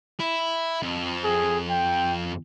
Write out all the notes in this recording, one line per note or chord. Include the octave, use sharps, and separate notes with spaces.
E4
F2
G#4
G5